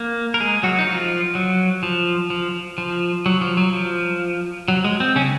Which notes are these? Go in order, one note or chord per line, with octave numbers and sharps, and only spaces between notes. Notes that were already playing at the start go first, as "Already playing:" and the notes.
Already playing: A#3
A#4
G#3 G#4
F#3 F#4
D#4
F3 F4
F#3
F3
F3
F3
F#3
F3
F#3
F3
F#3
G#3
C4
C#3 C#4